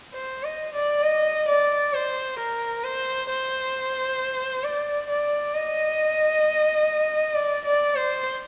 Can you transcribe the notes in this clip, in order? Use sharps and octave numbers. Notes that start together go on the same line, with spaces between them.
C5
D#5
D5
D#5
D5
C5
A#4
C5
C5
D5
D5
D#5
D5
D5
C5